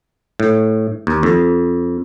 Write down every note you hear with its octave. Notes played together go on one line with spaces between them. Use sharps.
A2
D#2
F2